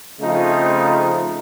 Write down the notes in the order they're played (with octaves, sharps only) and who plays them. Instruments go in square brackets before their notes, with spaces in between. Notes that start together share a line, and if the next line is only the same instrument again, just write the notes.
[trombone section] C#3 F3 A3 C4 D#4